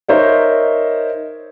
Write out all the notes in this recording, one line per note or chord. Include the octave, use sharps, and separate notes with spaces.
D#4 A#4 C5 C#5 E5